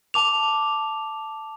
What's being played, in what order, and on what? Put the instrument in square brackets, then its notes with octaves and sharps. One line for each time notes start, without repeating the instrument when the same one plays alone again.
[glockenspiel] A5 D6 F7